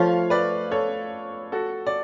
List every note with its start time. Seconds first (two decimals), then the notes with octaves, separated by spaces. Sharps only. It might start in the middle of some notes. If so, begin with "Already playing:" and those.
Already playing: F3 A3 F4 C#5 F5
0.30 B4 D5
0.71 A4 C#5
1.52 F#4 A4
1.87 D5